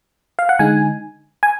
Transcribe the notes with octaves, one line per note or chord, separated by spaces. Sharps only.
F5
F#5
D3 G#3 D#4 G#5
G#5